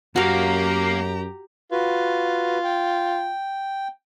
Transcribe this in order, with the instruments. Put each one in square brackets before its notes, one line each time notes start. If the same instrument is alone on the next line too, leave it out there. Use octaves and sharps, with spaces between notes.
[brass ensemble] F#2 [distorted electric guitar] A#3 [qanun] F#4 F5 [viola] G4 A#5
[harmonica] F4 [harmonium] F#4 B4
[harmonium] G5